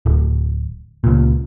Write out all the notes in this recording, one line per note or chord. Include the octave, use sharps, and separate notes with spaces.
D1
C#2 A#2